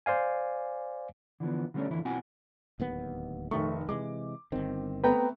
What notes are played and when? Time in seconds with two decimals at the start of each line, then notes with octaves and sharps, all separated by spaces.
0.06 C5 D5 F5 G#5
1.40 D3 E3 F3 B3
1.74 D3 G3 A3 A#3 C#4 D4
1.91 F2 D3 E3 E4
2.05 B1 C4 E4 F#4 F#5 G#5
2.80 D1 D#2 B3
3.51 F1 D#3 A3 C#6
3.89 C3 E3 G#3 D6
4.52 G1 D#3 C4
5.04 A3 B3 C4 B4 G5 A#5